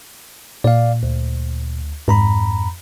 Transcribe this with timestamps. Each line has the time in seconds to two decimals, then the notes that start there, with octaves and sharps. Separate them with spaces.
0.64 A#2 D5 F5
1.03 D2
2.08 F2 G#2 A#5 B5